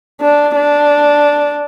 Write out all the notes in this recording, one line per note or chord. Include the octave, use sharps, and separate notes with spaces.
D4
D4